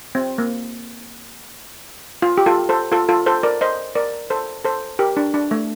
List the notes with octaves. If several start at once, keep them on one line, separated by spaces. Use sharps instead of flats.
C4
A#3
F4
G4
F4 A4
A4 C5
F4 A4
F4 A4
A4 C5
A#4 D5
C5 D#5
A#4 D5
A4 C5
A4 C5
G4 A#4
D4
D4
A3